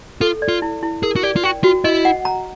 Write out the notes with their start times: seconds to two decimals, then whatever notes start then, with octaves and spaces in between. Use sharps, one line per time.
0.21 F4 A4
0.42 D5
0.48 F4
0.62 E4
0.83 E4
1.03 G#4 A#4
1.16 F#4
1.23 G4 D5
1.36 F4
1.44 F#4 G5
1.64 F4 F#4
1.84 E4 D#5
2.05 F#5
2.25 A#5